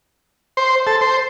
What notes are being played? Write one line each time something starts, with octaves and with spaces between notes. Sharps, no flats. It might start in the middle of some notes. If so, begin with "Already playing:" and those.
C5
A4
C5